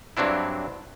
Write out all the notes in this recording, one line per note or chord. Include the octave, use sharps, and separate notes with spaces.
G2 F#3 C4 D4 E4